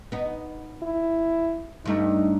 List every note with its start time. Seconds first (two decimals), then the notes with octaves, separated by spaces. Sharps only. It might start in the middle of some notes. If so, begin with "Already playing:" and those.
0.12 B3 D#4
0.83 E4
1.86 G2 A3 D#4